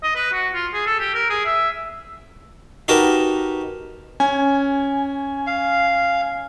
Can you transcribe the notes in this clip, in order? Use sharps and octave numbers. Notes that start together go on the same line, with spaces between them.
D#5
B4
F#4
F4
G#4
A4
G4
A#4
G#4
E5
D#4 F#4 G4 A#4 B4 A5
C#4 G#5
F5